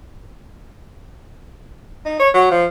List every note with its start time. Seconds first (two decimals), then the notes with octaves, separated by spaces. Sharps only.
2.05 D#4
2.19 C#5
2.34 F#3
2.50 F3